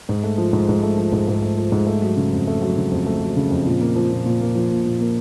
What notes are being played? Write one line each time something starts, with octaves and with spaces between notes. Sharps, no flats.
G#2
A3
F3
G#2
G#2
A3
F3
G#2
G#2
A3
F3
G#2
A3
F#3
C#3
F2
A3
F#3
C#3
F2
A3
F#3
C#3
F2
A#2
A#3
F3
A#2
A#2
A#3
F3
A#2
A#2
A#3